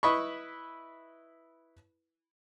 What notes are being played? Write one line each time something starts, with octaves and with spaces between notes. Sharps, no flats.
E4 B4 D#5 B5 C#6